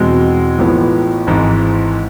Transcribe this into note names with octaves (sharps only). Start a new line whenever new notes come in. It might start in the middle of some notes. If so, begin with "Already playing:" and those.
Already playing: E2 B2 G#3 C4
A1 A2 F3 G#3 B3
G#1 G#2 E3 G#3